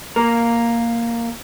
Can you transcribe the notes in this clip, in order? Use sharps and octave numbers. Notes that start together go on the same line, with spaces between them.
A#3 A#4